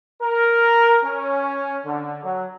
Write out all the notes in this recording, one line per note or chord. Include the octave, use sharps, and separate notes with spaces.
A#4
C#4
D3
F#3